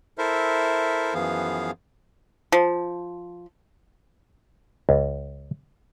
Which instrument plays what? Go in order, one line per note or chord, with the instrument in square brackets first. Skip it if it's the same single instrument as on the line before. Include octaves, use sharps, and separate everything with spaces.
[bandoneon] E4 A4 A#4 C5 E5
F#2 E3 F3 B3 G#4 F5
[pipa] F3
[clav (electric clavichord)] C#2